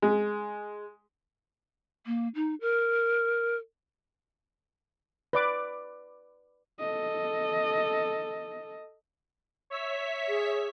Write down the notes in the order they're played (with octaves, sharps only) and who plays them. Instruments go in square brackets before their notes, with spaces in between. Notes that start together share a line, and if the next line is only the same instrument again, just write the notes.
[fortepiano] G#3
[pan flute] A#3
D#4
A#4
[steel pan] B4 D5 D6
[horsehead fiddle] A4 D#5
[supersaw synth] C#5 E5 B6
[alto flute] G#4